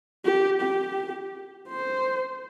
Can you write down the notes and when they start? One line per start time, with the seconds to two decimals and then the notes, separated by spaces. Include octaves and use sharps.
0.25 G4
0.61 G4
1.68 C5